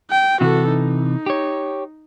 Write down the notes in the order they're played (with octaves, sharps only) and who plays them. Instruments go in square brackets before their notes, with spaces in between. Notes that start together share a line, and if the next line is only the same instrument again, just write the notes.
[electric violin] G5
[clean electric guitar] C3 E3 [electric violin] F#4 A4
[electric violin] D#4
[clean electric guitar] G4 C#5